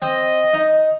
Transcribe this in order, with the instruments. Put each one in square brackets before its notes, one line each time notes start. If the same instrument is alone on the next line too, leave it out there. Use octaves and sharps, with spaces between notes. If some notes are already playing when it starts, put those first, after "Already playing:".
[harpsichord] C4 C5 [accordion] D#5
[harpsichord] D#4